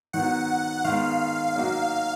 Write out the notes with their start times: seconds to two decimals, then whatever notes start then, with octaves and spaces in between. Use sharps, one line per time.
0.13 D#3 F#3 B3 F#5
0.84 D#3 G#3 B3 F5
1.55 F#3 A#3 D#4 F#4